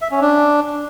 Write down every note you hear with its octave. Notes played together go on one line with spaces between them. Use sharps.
E5
C#4
D4